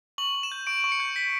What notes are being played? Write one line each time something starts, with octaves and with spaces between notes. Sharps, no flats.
C#6 F#7
C#6
E7
G6
C#6 D7
C#6
C#7
G6
G6 B6